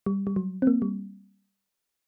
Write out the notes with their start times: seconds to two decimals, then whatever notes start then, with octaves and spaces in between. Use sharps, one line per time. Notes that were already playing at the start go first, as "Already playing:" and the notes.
0.06 G3
0.27 G3
0.36 F#3
0.62 C4
0.67 A#3
0.82 G3